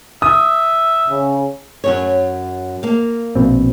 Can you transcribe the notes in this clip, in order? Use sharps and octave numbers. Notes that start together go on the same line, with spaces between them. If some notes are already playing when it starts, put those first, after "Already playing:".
E5 D#6
C#3
F#2 C#3 C#5
A#3 F5
A#1 B2 C4